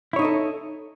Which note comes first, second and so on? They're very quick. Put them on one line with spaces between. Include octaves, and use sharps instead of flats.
E4 C#5 D#4 D#5 A4